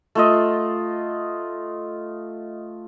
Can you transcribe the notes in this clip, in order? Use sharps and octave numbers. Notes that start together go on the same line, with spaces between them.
A3 F4 D#5